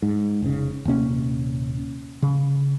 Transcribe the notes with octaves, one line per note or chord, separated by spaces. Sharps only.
G#2
F1 C#3
D#1 C3 A#3 C#4
C#3